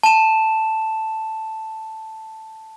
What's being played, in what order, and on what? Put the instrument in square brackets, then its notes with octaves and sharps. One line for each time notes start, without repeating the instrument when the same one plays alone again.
[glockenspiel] A5 E7